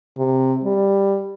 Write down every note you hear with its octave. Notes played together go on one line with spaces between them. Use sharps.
C3
G3